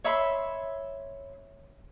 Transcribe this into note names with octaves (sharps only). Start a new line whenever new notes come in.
C#5 E5 B5 C6